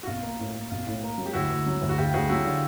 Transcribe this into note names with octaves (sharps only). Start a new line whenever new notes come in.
F#4
B1 F4
A#3
A2
A#3
B1 F4
A2
A#3
F#3
G4
D2 E4 F#4
D2
F#3
D2
F#4
D2 F4 G4
D2 F#4 G#4
F#3 E4 F#4
D3 F4